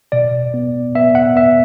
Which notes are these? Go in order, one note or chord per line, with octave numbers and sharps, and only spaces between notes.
B2 D5
B3
B3 E5
F#5
B3 E5